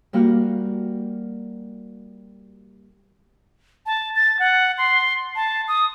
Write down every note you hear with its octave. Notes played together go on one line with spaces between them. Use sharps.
G3 A#3 F#4 F6
A5
A6
F#5
C6
A5
D#6